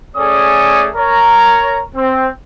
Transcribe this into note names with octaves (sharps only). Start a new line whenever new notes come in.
A3 C#4 G#4 A4 D5 D#6
A#4 C#5 A#5
C4